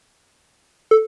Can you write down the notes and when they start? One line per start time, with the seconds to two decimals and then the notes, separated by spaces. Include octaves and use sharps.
0.91 A4